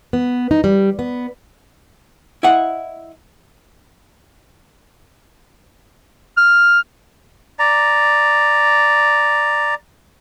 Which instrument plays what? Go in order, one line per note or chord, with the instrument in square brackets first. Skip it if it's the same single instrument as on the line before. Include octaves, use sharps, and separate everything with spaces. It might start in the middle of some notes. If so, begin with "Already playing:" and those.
[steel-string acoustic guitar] B3
D#4
G3
B3
[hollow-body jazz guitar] E4 D#5 F#5
[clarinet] F6
[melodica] D5 A#5